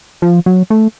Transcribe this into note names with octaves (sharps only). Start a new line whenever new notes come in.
F3
F#3
A3